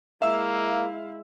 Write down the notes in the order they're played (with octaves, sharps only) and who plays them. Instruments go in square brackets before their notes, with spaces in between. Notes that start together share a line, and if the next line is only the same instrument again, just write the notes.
[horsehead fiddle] G#3 E4 [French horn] A#3 [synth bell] E5 [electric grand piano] F5 E6